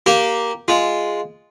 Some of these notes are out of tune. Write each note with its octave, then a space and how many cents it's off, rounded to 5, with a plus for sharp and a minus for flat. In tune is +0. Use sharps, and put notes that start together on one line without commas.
A#3 +0 G4 -10
G#3 +0 F4 +0